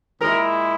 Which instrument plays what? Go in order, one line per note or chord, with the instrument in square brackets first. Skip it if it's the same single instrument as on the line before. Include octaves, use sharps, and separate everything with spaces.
[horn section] A#2 G#3 E4 [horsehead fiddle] A#4